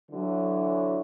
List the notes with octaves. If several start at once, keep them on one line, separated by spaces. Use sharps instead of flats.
D3 E3 F#3